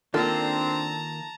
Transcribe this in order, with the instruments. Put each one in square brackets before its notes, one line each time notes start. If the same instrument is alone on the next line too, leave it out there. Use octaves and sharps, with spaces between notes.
[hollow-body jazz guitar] D#3 A#3 [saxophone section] C4 D4 [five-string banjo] F4 A4 [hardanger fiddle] A5 A#5